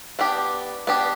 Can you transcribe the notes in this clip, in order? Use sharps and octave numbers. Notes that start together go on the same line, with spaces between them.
B3 D4 G4
B3 D4 G4